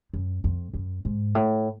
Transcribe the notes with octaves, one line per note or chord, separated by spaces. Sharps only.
F#2
F2
F#2
G#2
A2